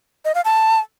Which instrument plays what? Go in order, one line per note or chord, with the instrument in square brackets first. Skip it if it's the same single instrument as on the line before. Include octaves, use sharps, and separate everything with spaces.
[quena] D#5
F5
A5